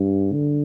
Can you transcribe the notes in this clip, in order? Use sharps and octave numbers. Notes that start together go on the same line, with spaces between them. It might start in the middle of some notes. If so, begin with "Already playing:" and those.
Already playing: G2
D3